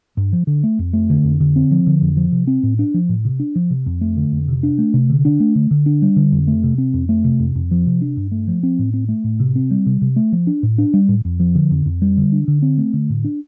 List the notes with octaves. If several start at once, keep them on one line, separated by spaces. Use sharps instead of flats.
G2
F3
D3
A3
F2
A3
D3
F2
D3
C4
F3
D3
F2
F3
C3
C4
A2
D4
F3
A2
C3
D4
F3
C3
F2
A3
D3
F2
C3
D4
A3
C3
D3
D4
A3
D3
D3
D4
G3
D3
F2
A3
C3
C4
F2
A3
C3
F2
F2
F3
C3
D4
G2
A3
F3
C4
A2
C4
A3
A2
C3
C4
G3
C3
C3
A3
F3
D4
A2
D4
G3
A2
F2
F3
D3
F2
F2
G3
D3
D4
D3
C4
A3
D3
A2
D4